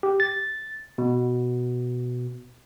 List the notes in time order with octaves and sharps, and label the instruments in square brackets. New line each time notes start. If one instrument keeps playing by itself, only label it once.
[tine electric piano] G4
A6
B2